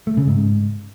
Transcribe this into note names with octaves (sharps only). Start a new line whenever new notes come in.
A3
C#3
G#2